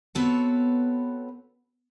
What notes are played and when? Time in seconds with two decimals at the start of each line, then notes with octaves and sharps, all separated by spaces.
0.15 B3 C4 F#4 A4 B4 C#5